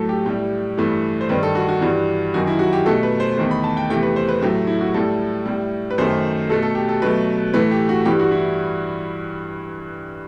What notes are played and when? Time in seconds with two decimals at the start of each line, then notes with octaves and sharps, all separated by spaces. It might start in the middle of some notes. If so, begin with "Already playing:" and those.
Already playing: A2 F#3 A3 A4
0.09 G4
0.26 A2 G3 G4
0.77 G2 E3 A3
1.21 C5
1.29 G2 D#3 G3 B4
1.43 A4
1.55 F#4
1.69 F#4
1.81 G2 E3 G3
2.34 F#2 D#3 F#3 F#4
2.47 E4
2.59 F#4
2.73 G4
2.86 B2 A3 A4
3.03 B4
3.20 C5
3.37 E2 D#3 A3 C5
3.51 B5
3.64 A5
3.77 G5
3.90 E2 C3 E3 A3 G5
4.03 B4
4.16 C5
4.29 B4
4.41 A2 F#3 A3 G4
4.67 E4
4.81 F#4
4.94 A2 G3 A4
5.46 A2 G3
5.91 B4
5.98 F#2 D#3 A3 C5
6.49 B2 A3 A4
6.63 A4
6.75 G4
6.89 A4
7.02 B2 F#3 A3 B4
7.54 A2 E3 A3 B4
7.71 G4
7.89 F#4
8.05 G2 E3 G3 G4
8.19 F#4
8.31 E4